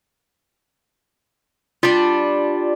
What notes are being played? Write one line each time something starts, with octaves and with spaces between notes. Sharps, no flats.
G3 D4 F4